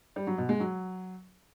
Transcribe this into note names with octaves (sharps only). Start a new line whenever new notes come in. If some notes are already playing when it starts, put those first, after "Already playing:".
G3
F#3
B2
G#3
F#3